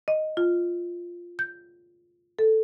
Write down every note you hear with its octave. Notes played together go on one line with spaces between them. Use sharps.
D#5
F4
G6
A4